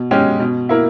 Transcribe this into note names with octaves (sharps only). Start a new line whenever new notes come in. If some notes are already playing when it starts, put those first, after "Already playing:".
Already playing: B2
G#3 C#4 G4
B2
A#3 E4